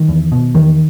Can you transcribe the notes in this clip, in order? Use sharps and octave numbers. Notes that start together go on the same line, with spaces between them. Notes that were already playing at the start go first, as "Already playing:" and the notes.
Already playing: D#3
E2
B2
E2 D#3